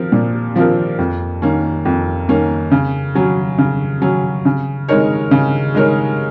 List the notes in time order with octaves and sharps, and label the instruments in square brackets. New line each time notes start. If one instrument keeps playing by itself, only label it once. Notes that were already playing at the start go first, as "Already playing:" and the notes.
Already playing: [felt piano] F3 C4 A#4
A#2
F3 C4 F4 A#4
F2
D#3 A#3 C#4
F2
D#3 A#3 C#4
C#3
F#3 C#4
C#3
F#3 C#4
C#3
G#3 D#4 A#4 C#5
C#3
G#3 D#4 A#4 C#5